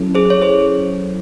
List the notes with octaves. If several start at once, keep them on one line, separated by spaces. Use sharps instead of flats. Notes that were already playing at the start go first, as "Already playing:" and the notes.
Already playing: F#3 C#4 E4 A4
G#4 C5
C#5
G#4 C5